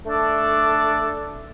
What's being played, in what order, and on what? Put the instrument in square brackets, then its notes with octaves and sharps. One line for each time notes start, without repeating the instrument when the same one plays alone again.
[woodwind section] A3 D4 A4 D5